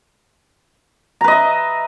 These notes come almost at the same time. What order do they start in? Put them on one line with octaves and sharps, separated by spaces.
A#5 B4 D#5 E5